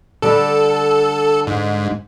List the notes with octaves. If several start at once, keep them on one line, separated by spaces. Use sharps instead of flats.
D3 G3 A4
G#2